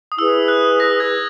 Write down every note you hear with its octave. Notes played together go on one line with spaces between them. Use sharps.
D#6
E4 G#4 B4 E6
F#6
A#6
G#6